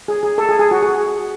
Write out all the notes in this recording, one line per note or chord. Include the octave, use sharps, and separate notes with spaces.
G#4
G#4
A4
G#4
G#4
F#4
G#4